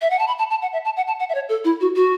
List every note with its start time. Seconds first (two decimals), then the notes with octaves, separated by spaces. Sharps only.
0.02 E5
0.10 F#5
0.19 A5
0.27 B5
0.39 A5
0.50 A5
0.62 F#5
0.73 E5
0.85 A5
0.97 F#5
1.07 A5
1.19 F#5
1.29 E5
1.35 C#5
1.49 A4
1.65 E4
1.81 F#4
1.96 F#4